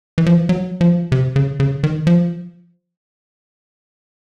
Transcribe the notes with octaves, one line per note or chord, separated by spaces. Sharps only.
E3
F3
E3
F#3
F3
C3
C#3
C#3
D#3
F3